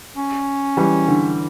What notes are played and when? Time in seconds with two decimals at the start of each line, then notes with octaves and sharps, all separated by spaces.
0.17 C#4
0.77 E3 G3
1.08 D3